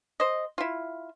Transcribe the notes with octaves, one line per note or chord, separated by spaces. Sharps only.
C5 D#5
E4 F4